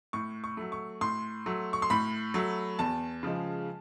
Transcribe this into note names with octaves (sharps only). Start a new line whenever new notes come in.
A2 C#6
C#6
F#3 A3
C#6
A2 C6
F#3 A3
C#6
C6
A2 B5
F#3 A3
E2 A5
C#3 F3 G#3